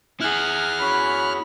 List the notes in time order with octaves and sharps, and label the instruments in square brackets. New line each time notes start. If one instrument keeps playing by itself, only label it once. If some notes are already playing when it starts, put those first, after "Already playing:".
[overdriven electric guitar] E4 G#4 [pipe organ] F6 F#6
[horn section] C#4 F#4 C#5 [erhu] B5